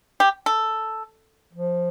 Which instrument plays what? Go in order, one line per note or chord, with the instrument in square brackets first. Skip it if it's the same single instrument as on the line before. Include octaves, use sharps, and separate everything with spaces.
[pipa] G4
A4
[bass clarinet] F3